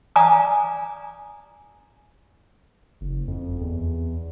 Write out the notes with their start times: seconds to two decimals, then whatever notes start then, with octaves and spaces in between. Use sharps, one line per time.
0.16 D5 F5 G#5 A#5 D6 D#6
3.01 F#1
3.28 F2
3.61 E2